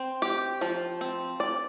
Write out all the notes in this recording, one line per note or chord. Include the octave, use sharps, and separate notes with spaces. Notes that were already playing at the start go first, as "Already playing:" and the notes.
Already playing: C4
G4
F3
C4
D5